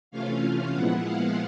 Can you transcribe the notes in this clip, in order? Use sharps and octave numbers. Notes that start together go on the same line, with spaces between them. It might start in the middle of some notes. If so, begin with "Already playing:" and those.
C3 E3 A3 C#4 F4 F5
A#2 F3 G#3 B3 E4 F#5
F5